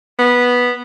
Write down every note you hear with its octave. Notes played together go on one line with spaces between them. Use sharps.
B3